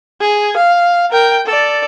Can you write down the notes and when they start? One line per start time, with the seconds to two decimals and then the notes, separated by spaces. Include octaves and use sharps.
0.21 G#4
0.57 F5
1.11 A#4 G5
1.46 A4 D5